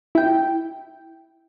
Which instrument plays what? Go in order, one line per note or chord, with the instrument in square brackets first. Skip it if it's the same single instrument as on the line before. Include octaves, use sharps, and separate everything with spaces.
[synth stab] E4 G5